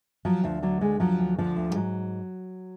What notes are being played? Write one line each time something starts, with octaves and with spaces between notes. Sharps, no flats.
F3 F#3
D2 F3
D3 F#3
D2 G#3
F3 F#3
D2
D3 F3
D2
G3
G#2 F#3